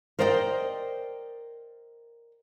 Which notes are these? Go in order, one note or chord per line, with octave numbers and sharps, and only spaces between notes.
A#4 C5 D5 D#5 F#5 G5